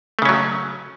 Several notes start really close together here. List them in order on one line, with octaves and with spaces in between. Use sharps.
A3 C#3 C#4 F#3